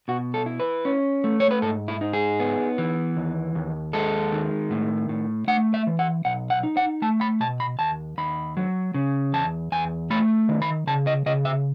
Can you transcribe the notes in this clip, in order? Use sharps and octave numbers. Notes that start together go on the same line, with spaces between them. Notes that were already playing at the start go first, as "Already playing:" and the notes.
B2 F#4
A4
E4
B4
C#4
A3
C#5
B4
G#2 A4
E4
D#4
G#4
B3
E3
D#2
D#2
G#3 A4
D#3
A2
A2
A3 F#5
E5
E3
F#5
B1 F#5
F#5
D#4
F#5
A3 A5
B5
B2 A5
B5
D#2 A5
D#2 B5
F#3
C#3
E2 A5
E2 G#5
A3 B5
D#3
B5
C#3 A5
D#5
C#3 D#5
E5